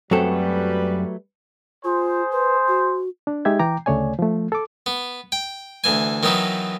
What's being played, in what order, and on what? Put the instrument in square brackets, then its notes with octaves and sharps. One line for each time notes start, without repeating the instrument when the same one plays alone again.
[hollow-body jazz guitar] F#2 C4 A4 [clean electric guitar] F#3 A3 [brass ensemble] G3 B4
[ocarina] F4 [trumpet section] G#4 C5
[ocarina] B4
F#4
[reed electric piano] D4
G#3 D#4 G4 E5 G#6
E3 G5 A#5 D6
D2 C#3 A3 C#5 D5 G#5
F3 A3
A4 D6
[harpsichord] B3
G5
D2 E3 G#5
D#3 E3 F#3 B3 D#4